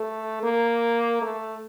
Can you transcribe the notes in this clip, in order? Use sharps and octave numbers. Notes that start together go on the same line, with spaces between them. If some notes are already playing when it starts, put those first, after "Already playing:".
Already playing: A3
A#3
A3